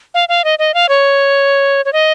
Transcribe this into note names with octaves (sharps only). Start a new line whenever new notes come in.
F5
F5
D#5
D#5
F5
C#5
C#5
D#5